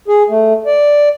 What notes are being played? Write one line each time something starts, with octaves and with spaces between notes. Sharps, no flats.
G#4
A3
D5